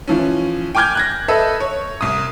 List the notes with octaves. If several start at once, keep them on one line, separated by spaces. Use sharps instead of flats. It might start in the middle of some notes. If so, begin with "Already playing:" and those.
E3 F3 C#4
G5 G#5 D6 F6 G6 G#6
F#6 G#6 A#6
A4 B4 D#5 E5 E6
C#5
C2 D#6